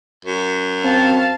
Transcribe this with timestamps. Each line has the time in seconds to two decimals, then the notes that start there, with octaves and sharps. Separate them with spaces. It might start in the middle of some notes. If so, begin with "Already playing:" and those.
0.25 F#2
0.83 C4 F5 A5